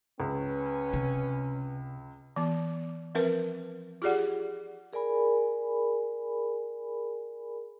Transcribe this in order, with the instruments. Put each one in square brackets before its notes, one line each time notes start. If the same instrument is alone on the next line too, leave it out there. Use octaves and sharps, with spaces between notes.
[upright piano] C#2 [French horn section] C#4 B4
[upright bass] C3
[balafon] E3 B3
F3 C4 A#4 B4 E5
F4 G4 G#4 D5 F#5
[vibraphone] G#4 A#4 D5 G#5 B5